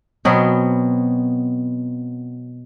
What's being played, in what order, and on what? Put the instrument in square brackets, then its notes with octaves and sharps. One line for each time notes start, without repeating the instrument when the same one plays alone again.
[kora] B2 F#3 B3 C4